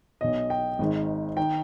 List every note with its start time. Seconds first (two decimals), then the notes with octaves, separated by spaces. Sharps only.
0.21 B1 B2 D#5
0.50 G5
0.79 G#1 G#2 D#3
1.37 D#3 G5